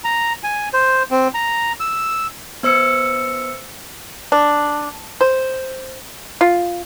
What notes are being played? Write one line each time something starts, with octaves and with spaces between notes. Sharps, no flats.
A#5
G#5
C5
C4
A#5
E6
B3 C5 E6 C#7
D4
C5
F4